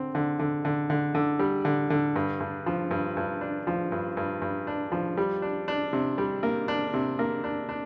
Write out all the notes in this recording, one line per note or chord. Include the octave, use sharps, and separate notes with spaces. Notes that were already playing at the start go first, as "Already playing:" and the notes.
Already playing: D3 C4
D3
D3
D3
D3
D3
G3
D3
D3
G2
G2
F3
G2
G2
D4
F3
G2
G2
G2
D4
F3
G3
D4
D4
C3
G3
A#3
D4
C3
A#3
D4
D4